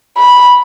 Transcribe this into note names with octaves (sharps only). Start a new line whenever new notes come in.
B5